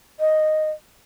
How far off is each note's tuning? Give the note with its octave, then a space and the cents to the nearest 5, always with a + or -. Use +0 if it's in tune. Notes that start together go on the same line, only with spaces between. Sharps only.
D#5 -5